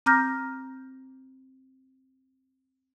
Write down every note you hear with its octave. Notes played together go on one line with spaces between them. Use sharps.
C4 A#5 D6 F6 G6 A#6